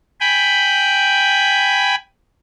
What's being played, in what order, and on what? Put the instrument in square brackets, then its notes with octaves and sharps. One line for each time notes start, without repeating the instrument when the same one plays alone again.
[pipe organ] G5 G#5 B5